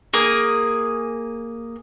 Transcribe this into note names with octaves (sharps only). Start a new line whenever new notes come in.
A#3 G#4